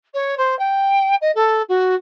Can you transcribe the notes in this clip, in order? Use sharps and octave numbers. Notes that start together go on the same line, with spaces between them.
C#5
C5
G5
D#5
A4
F#4